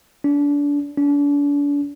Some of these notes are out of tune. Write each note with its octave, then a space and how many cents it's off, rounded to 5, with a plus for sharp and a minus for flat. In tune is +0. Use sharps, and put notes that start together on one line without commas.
D4 -30
D4 -40